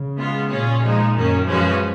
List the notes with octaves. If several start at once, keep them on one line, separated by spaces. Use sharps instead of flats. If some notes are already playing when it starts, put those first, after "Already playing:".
Already playing: C#3
G#3 B3 F4
A#2 C#4 F4 G#4 C#5
F3 G#3 D#4
F#2 D#3 A#3 C#4
F3 G#3 C#4 F#4 B4